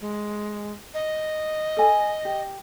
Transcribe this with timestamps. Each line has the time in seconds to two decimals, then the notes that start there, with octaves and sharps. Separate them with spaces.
0.01 G#3
0.94 D#5
1.77 A4 G#5
2.25 G4